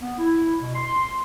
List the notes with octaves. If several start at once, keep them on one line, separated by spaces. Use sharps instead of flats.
B3
E4
B2
C6